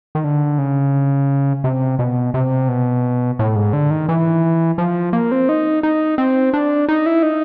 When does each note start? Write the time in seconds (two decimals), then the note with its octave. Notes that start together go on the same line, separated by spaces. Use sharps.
0.15 D#3
0.24 D3
0.58 C#3
1.64 C3
1.99 B2
2.34 C3
2.68 B2
3.39 A2
3.56 G#2
3.73 D3
3.90 D#3
4.09 E3
4.78 F3
5.13 A#3
5.32 C4
5.49 D#4
5.83 D#4
6.18 C4
6.54 D4
6.88 D#4
7.06 E4
7.23 D#4